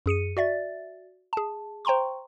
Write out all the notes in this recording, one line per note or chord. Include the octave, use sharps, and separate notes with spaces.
F#2 G#4 C#7 D#7
F#4 D5 E5 A6
G#4 A5
C5 G5 A#5 C6 C#6